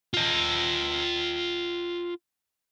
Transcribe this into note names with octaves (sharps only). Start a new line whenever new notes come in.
F4 D#5